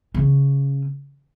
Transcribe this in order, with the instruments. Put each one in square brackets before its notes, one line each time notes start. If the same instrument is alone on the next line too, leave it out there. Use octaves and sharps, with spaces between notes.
[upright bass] C#3